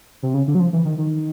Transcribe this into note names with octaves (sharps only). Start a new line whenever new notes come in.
C3
C#3
D3
F#3
F3
E3
D#3
D#3